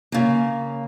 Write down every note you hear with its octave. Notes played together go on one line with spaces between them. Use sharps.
C#3 A#3